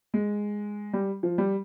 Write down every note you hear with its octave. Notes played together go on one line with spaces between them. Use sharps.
G#3
G3
F3
G3